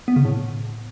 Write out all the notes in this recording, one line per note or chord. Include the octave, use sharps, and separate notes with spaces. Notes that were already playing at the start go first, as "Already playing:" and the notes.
B3
C#3
A2